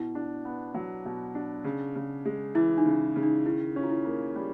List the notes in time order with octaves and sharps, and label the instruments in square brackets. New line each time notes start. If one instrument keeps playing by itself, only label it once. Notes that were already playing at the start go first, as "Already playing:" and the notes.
Already playing: [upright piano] B2 [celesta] E4
[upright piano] D4
B3
F#3
B2
D4
C#3
C#3
G#3
[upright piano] E3 [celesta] E4
[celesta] D#4
[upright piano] C#3
C#3
[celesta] D#4
[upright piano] D#3 [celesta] E4
[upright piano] C#4
[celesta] F4
E4
[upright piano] A#3
G3